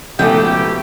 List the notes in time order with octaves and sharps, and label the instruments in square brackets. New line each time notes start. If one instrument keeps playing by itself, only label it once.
[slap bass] C#2 F3 B3 [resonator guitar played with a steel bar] G#2 B2 A3 [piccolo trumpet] G4 [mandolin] G5